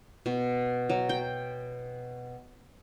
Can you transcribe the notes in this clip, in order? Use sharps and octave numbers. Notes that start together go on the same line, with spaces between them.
B2
F#3
G5